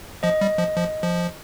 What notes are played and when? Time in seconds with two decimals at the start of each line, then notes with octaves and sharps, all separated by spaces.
0.23 F3 D#5
0.41 G3
0.58 F3
0.76 F3
1.03 F3